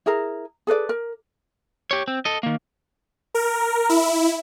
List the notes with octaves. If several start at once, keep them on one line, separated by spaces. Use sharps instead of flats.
E4 G#4 A#4 A#5
G#4 A4 B4 D5
A#4
G4 C#5
C4
A4 D#5
D#3 A#3
A#4
E4